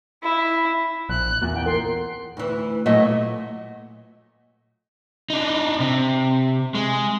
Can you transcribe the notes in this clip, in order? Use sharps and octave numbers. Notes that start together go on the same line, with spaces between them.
E4
A#1 F#6
E2 A#2
F#5 G5
A#4 C6
D2 E3
A#2 F#3 A3 D#5 E5
D4 D#4
C3
G#3